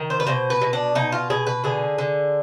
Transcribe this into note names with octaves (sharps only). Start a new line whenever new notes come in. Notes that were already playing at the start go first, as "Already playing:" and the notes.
Already playing: D#3
C5
B4
B2 C5
B4
B2
D4
B2 D#4
F4
B2 G#4
B4
D3 G#4
D3